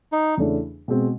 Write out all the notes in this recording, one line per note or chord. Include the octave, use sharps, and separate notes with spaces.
D#4
E2 C#3 E3 A3 D4
B2 G#3 C4